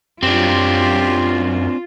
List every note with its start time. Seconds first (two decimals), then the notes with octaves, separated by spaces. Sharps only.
0.23 F#2 C4 D4 F4 G4